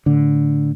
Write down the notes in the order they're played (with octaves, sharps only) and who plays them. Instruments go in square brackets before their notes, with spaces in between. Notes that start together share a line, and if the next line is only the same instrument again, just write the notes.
[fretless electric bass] A2 D3